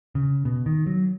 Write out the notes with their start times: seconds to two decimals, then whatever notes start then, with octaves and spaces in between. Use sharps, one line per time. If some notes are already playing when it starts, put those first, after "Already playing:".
0.15 C#3
0.45 B2
0.66 D#3
0.87 F#3